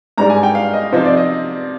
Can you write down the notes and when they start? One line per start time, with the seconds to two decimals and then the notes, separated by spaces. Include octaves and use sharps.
0.18 G#2 G3 D4 A#5
0.30 G#5
0.43 G5
0.55 F5
0.73 D#5
0.92 C3 F3 C4 D#4 C5
1.05 D5
1.17 D#5